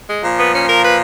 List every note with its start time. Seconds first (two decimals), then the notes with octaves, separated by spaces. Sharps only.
0.09 G#3
0.23 A#2 F3
0.38 B3
0.53 C#4
0.68 A#4
0.83 B4